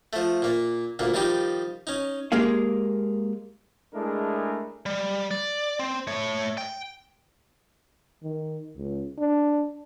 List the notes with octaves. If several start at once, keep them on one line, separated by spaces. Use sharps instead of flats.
F3 A3
A#2 A#3
D2 A#2 A#3
D#3 F3 G3 D#4 G4
C#4 D#4
G#3 A#3 G4 G#4 F5
G#3 A3 D4 E4 G#4 A#4
G3
D5
C4
A3 C#5
G5
D#3
C#2
D4